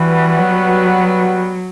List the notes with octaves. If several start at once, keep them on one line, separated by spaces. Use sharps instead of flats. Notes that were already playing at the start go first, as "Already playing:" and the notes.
Already playing: E3 G3 B3 F#4 B4 F#5
F#3